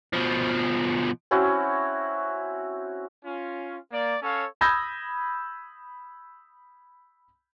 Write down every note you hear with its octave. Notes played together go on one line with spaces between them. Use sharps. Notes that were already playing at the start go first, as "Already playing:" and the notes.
B2 F3
C4 C#4 E4 F#4
C#4 F4
A#3 D5
C#4 A4 C#5 F5
B5 D#6 E6 G6 G#6 A#6